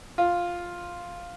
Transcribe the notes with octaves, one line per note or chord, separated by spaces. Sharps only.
F4